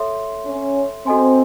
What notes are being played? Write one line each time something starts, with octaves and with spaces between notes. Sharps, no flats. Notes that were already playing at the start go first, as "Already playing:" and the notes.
Already playing: A4 C#5 E5 C6
C#4
C4 F#4 A4 D#5 G#5 C6